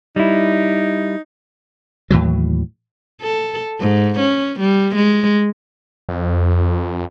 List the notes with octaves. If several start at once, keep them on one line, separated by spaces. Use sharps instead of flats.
G3 D#4 E4
D#2 A2 E3 F#3
A4
G#2
C#4
G3
G#3
F2